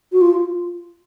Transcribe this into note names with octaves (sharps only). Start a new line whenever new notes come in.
F#4
F4